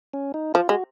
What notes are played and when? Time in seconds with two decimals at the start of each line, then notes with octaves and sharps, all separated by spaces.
0.14 C#4
0.34 D#4
0.54 F3 F4
0.69 G#3 F#4